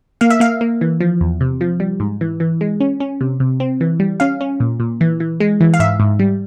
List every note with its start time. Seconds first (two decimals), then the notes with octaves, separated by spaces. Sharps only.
0.21 A#3 F5
0.30 E5
0.40 A#3 F5
0.61 A#3
0.81 E3
1.00 F3
1.21 E2
1.41 C3
1.61 F3
1.80 G3
2.00 G#2
2.21 E3
2.40 E3
2.61 G#3
2.80 C#4
3.00 C#4
3.21 C3
3.40 C3
3.60 C4
3.81 E3
4.00 G3
4.20 C#4 F5
4.41 C#4
4.60 A#2
4.80 A#2
5.01 E3
5.20 E3
5.40 G#3
5.61 E3
5.74 F5
5.79 G#2 E5
6.00 G#2
6.19 G3